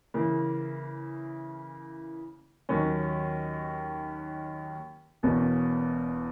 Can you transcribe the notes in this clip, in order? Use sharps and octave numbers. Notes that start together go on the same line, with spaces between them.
C#3 E3 A#3
D#2 D#3 F#3 C#4
E1 E2 B2 A#3 C#4